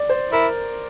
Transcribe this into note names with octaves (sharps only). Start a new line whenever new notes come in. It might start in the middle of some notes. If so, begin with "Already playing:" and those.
Already playing: D5
C5
E4 A#4